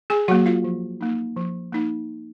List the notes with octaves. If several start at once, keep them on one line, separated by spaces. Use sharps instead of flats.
G#4 G#5
F#3 A#3 F#4 F#5
F4 F5
F3
A#3 D#4
F3
A#3 D#4